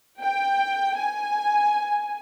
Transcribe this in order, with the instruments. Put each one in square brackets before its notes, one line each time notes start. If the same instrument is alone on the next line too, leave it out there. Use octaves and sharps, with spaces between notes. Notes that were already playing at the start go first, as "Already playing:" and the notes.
[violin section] G5
G#5